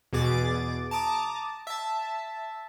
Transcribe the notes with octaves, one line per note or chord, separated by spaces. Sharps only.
E2 B2 G#4 D6 A6
A5 A#5 D6 D#6
E5 A5